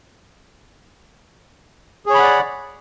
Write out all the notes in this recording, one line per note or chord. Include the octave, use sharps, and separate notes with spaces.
G#4 C#5 D5 F#5 B5